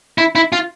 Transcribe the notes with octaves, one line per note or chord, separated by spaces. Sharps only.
E4
E4
F4